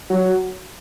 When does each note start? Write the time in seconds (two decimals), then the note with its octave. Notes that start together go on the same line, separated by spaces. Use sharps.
0.10 F#3